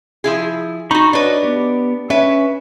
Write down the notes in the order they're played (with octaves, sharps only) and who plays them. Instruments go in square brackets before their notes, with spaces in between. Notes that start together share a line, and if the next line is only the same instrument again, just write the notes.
[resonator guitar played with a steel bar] F3 E4 G#4
[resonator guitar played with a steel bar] D#4 F#4 [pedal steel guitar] A#5 B5 C#6
[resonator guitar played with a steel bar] D4 B4 [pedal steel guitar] F#4 C#5 D#5
[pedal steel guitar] B3 G4
[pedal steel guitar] C#4 [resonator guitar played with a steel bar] B4 E5